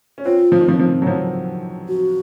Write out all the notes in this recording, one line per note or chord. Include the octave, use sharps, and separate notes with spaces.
C#4
C4 F4
F3
D#3
F3
F3
F#3
F3
F#4